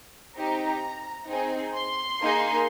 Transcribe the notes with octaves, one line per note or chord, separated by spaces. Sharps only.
C4 D#4 G4 A#5
C4 D#4 G#4
C6
A#3 D#4 G#4